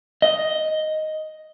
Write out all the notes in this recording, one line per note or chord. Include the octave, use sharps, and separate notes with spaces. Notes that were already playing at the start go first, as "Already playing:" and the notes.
D#5